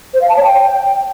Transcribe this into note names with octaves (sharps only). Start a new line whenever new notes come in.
C5
F5
A5
C#5
G5